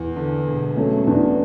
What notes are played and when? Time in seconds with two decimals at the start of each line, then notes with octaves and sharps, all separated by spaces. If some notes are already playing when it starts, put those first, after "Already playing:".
Already playing: E2 B3
0.16 D3
0.47 E1
0.76 F#3 A3 C#4
1.07 E2 B3 D4